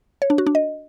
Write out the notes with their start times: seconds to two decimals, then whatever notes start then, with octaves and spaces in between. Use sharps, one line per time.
0.22 C#5
0.30 D4
0.38 F#4
0.47 D4
0.55 D#5